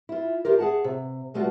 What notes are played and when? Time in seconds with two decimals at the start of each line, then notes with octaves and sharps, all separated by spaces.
0.09 E4 F4
0.45 E4 F4 G4 A#4
0.58 G#4 F#5 A5
0.84 C3
1.34 B2 G3 A3 B3 F4 F#4